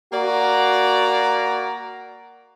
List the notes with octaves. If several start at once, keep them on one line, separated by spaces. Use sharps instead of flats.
A#3 F#4 D5 A#5